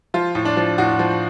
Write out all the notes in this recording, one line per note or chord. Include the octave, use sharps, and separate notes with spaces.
F3 F4
A2
D4
F3
A2 F#4
F3